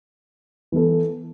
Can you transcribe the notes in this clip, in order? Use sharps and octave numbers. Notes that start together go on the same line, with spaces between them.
E3 B3 E4 A4